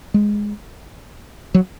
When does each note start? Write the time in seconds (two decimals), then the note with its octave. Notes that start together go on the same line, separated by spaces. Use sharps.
0.14 G#3
1.54 F#3